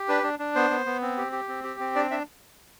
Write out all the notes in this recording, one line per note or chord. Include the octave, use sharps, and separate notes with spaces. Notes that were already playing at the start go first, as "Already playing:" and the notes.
Already playing: G4
D4 B4
D4
D4
B3 C5
B3
B3
C4
G4
G4
C4
G4
C4
D4 D5
D4 E5